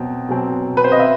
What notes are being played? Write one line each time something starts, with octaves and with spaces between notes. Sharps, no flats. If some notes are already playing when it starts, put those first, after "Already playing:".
Already playing: B2 F#3 C4
B2 F#3 C4
B4
C5
D#5
E5